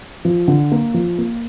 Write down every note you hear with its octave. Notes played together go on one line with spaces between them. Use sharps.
F3
D3
A#3
F3
A#3